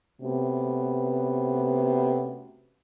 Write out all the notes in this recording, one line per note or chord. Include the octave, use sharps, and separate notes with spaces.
C3 A3 B3 C#4 F#4